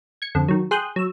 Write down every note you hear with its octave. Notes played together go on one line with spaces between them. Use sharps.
G#6 C#7
F2 D3
D#3 F#3
G#4 G5 C6 D#6 F#6 G6
F#3 E6